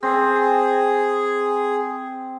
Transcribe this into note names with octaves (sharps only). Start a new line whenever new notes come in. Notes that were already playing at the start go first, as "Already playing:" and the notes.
C4 G#4